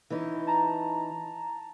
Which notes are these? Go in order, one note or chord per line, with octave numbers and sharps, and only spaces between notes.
E3 C#4 D#4
A5 A#5